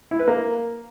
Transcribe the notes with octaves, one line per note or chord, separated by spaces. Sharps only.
E4
B4
A#3